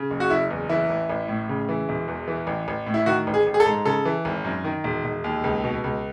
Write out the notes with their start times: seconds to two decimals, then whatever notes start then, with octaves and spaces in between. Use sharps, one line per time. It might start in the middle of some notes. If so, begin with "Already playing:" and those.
Already playing: C#3
0.11 F#1
0.20 F#4
0.30 F#1 E4
0.50 E2
0.69 E3 E4
0.89 A1
1.10 A1
1.28 A2
1.49 C#3
1.69 E3
1.89 E1
2.08 E2
2.28 E3
2.47 A1
2.68 A1
2.86 A2
2.94 E4
3.06 D#3 F#4
3.27 A1
3.34 G#4
3.47 A1
3.54 G#4
3.60 A4
3.66 G#2
3.85 C#3 A4
4.05 E3
4.25 G#1
4.45 F#2
4.64 D#3
4.84 E1
5.05 E1
5.24 D#2
5.44 C#2
5.64 B2
5.84 C#2